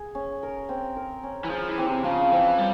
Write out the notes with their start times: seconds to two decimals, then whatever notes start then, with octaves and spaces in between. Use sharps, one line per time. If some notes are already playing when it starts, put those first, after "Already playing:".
Already playing: G#4
0.15 C#4
0.43 A#4
0.69 C4
0.96 A#4
1.23 C#4
1.44 E3
1.50 F3 G#4
1.68 E3
1.78 C4
1.86 C3
2.04 C#3 F3
2.31 E3 C4
2.58 G3 C#5